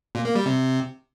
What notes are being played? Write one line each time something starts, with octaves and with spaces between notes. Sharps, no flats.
A#2
A#3
G3
C3